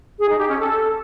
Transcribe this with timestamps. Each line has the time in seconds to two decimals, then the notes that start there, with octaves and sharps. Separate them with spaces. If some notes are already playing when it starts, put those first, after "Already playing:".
0.19 G#4
0.29 D#4
0.39 G4
0.48 C#4
0.58 A4